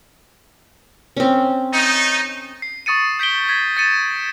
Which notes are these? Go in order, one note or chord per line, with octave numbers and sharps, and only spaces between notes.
C4 C#4
A3 D#4
C7
C#6 D#6 A6 C#7 D#7
G6 B6 D7 G7
G#6 B6
A6 C#7 D#7 E7